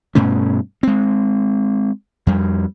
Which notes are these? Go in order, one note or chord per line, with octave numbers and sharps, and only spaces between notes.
G2 B2 A3 C#4
G#3 C4
F2 G3